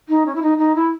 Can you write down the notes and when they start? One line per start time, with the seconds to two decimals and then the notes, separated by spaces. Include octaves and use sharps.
0.09 D#4
0.26 C#4
0.35 E4
0.42 D#4
0.58 D#4
0.75 E4